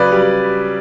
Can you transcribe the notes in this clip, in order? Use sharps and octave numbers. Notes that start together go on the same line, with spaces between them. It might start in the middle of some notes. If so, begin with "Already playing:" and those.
Already playing: C#3 F#3 B4 D5
G3